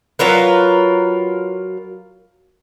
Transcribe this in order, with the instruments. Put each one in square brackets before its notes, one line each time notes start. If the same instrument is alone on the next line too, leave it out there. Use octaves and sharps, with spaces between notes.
[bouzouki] F#3 F4 A#4 B4